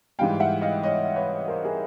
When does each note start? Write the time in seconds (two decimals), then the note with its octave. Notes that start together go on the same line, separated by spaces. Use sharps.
0.19 G#2 E3 G3 F5 G5
0.40 E5 F#5
0.61 D#5 F5
0.83 C#5 D#5
1.16 B4 C#5
1.48 A#4 C5
1.64 G#4 A#4